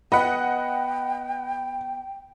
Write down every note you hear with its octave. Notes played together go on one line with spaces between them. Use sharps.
B3 D#5 F#5 G5 B5